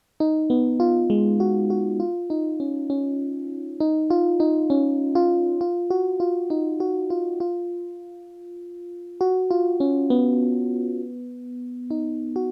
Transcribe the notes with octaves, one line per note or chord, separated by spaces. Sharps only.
D#4
B3
F4
G#3
F#4
F#4
F4
D#4
C#4
C#4
D#4
F4
D#4
C#4
F4
F4
F#4
F4
D#4
F#4
F4
F4
F#4
F4
C#4
B3
D#4
F#4